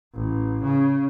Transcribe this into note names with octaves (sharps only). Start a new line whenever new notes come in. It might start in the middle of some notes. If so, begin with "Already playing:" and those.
A1
C#3